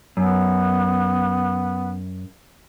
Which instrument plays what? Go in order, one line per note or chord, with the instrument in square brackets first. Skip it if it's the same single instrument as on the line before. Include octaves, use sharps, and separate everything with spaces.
[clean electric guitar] F#2 [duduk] B3